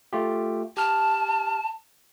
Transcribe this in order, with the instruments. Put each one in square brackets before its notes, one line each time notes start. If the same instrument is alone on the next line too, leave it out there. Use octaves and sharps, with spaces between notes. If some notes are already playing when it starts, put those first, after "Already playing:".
[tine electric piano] A3 F4 G4
[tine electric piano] G4 F6 [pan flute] A5